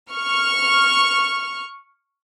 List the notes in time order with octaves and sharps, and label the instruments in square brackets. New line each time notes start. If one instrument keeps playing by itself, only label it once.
[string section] C#6 F6